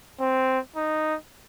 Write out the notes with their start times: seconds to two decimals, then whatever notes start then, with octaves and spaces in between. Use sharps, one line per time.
0.20 C4
0.76 D#4